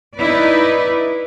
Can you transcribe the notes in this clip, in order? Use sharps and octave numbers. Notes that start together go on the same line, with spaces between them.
D#4 E4 B4 D5